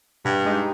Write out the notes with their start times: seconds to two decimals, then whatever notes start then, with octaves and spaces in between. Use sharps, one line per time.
0.25 G2 B2
0.45 G#3 D#4 G4